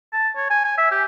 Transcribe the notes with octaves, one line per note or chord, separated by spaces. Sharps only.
A5
C#5
G#5
G#5
E5
G4